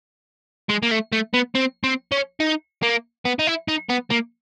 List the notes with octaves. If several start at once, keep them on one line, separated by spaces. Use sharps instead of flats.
G#3
A#3
A3
A3
B3
C4
C4
C#4
D#4
A#3
B3
D#4
E4
D#4
B3
A#3